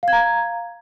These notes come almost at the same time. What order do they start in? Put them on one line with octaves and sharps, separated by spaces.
F5 G#6 A#5